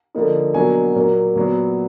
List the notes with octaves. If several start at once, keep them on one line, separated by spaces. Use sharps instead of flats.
D3 F3 A#3 D#4
B2 F#3 A#3 D4 G#5
A#2 F#3 A#3
A#2 F#3 B3